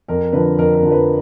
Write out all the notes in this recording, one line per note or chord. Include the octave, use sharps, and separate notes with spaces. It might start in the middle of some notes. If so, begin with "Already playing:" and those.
F2 A#4
D3 F3 B4
F2 A#4
A#4
D3 F3
B4